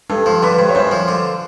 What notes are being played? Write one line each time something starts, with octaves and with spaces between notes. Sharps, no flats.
G2 A4
F3
D3 B4
G2
C#5
F#2 C5
F3
D3